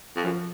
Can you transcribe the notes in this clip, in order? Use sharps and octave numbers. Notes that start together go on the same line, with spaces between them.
F2
F#2 F3